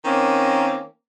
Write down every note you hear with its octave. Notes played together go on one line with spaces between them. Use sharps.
D#3 A#3 C4 C#4